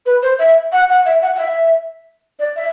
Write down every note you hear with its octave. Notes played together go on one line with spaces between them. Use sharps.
B4
C5
E5
F#5
F#5
E5
F#5
F#5
E5
D5
E5